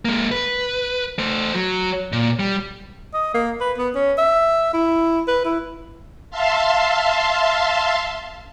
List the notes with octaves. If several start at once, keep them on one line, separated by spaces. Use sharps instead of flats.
G#3 A#3
B4
A3 C5
F#3
A#2
G3
D#5
A#3
B4
B3
C#4
E5
E4
B4
E4
E5 F5 A5 C6